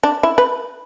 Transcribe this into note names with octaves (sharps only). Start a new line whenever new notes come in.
D4
E4
B4